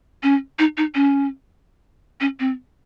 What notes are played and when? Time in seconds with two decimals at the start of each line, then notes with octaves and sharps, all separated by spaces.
0.23 C#4
0.59 D#4
0.77 D#4
0.95 C#4
2.21 C#4
2.40 C4